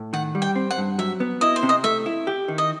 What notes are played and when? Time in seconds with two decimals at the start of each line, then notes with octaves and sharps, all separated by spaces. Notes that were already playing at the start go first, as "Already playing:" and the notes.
Already playing: A2
0.13 D#3 F#5
0.35 G3
0.42 G5
0.56 C4
0.71 F#5
0.78 G2
0.99 F#3 E5
1.20 B3
1.41 E4 D#5
1.56 C5
1.63 C3
1.69 D#5
1.84 A3 E5
2.06 E4
2.27 G4
2.48 D#3
2.58 D#5